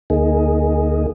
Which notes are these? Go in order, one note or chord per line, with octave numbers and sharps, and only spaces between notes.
D2 A#3 D#4 G#4